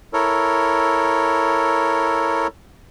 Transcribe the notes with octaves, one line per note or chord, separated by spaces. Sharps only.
E4 A4 A#4 C#5